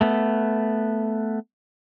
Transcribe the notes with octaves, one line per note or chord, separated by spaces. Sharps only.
A3 B3